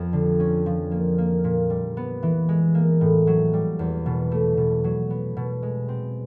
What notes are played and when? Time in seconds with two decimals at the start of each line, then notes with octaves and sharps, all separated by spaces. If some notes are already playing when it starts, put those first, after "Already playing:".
Already playing: F2 F3 B3
0.13 D3
0.40 C#4
0.66 F3
0.91 A#3
1.18 A#3
1.44 A#2
1.70 G3
1.97 B3
2.23 E3
2.49 G#3
2.75 A#3
3.01 A2
3.27 F#3
3.53 G3
3.79 E2
4.06 B2
4.31 A3
4.57 B2
4.84 F#3
5.10 B3
5.37 B2
5.63 G#3
5.88 C4